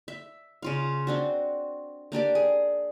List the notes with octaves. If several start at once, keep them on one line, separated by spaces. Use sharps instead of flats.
E5
C#3 F4 F5
C4 D4 F#4
A#3 D4 G4 D5
G#4